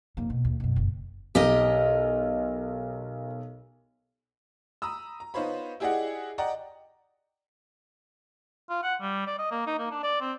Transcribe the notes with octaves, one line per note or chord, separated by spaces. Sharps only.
F1 A#3
B2
D#2
F#2 B2
F#1
B1 G4 A#4 D#5
A#5 B5 D#6 E6
A#5
B3 D#4 F4 C5 C#5 B5
E4 G4 G#4 D5 D#5 F#5
D5 D#5 F#5 G5 A#5
F4
F#5
G3
D5
D#5
A#3
D#4
A#3
D4
D5
C4